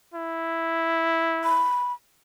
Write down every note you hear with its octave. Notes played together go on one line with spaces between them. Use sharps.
E4
B5